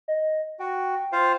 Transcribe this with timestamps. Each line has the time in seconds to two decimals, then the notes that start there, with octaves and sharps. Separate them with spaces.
0.08 D#5
0.59 F#4 G5
1.13 F4 C5 F5